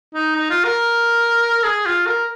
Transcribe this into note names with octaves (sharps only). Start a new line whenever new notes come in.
D#4
D#4
F4
A#4
G#4
F4
A#4